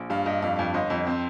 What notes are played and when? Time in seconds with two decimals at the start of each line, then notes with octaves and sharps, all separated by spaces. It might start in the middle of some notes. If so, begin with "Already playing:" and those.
Already playing: A#1
0.10 G2 F5
0.26 G2 D#5
0.42 F2 F5
0.59 F2
0.74 G1 D#5
0.90 F2
1.07 C4